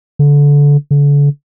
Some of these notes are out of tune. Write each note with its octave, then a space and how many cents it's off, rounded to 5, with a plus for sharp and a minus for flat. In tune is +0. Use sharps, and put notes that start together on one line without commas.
D3 -25
D3 -40